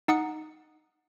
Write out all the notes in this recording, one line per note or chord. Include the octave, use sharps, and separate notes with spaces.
D#4 F#5 D#6 C#7